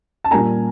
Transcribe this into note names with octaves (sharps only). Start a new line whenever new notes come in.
A5
A#2 G3 A#3 D4 G#5 A#5